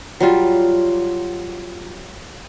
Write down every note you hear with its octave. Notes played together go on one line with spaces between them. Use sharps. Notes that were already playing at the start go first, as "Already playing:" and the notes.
F#3 G3 F4